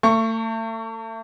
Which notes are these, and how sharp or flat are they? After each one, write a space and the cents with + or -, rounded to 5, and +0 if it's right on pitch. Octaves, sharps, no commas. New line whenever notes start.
A3 +35 C#6 +0